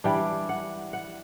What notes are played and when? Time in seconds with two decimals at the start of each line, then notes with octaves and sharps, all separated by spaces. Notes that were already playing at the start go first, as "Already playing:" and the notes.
0.04 E3 G3 D4 G5
0.49 F#5
0.93 F#5